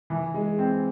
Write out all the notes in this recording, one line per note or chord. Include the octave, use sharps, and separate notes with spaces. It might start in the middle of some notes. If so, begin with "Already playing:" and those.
E3
G#3
C4